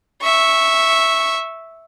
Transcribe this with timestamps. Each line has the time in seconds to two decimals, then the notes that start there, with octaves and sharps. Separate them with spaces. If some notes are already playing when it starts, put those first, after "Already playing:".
0.22 E5 C#6